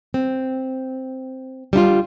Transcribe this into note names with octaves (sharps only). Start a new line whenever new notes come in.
C4
G3 D4 E4 F4